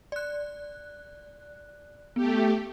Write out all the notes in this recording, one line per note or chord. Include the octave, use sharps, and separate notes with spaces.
D5 F#6
A3 B3 G4